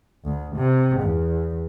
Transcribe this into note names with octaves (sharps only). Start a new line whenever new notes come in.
D2
C3
E2